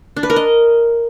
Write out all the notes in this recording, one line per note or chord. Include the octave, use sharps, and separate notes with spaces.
D4
B4
A#4
D#5